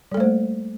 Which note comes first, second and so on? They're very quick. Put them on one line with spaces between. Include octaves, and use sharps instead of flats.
G3 A4 A3 C5 A#3